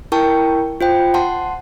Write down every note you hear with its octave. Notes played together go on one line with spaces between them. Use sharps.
E4 A#4 G5 A5 C#6
F4 C5 G5
F#5 A5 C6